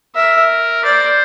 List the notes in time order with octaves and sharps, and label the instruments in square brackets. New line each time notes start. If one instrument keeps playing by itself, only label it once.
[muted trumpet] A#4 [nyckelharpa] E5
[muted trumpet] C5 [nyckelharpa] D5